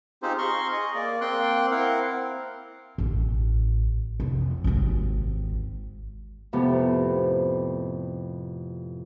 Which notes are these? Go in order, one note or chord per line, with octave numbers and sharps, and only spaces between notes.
C4 D#4 F4 G4 G#4 C5
A#5 C6 C#6 F6
G#4 D#5
A#3 D5
A#3 C4 G5 C6 F#6
C4 E4 A#4 F5 F#5
A1
F1
G#1 D#2
F2 A2 C3 B3